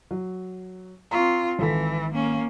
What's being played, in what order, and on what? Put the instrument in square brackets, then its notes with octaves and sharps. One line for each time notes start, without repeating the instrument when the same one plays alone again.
[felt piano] F#3
[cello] C4 F4 [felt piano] A#5 C6 C#6
[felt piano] G#1 A4 B6 [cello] E3
[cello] A#3 C#4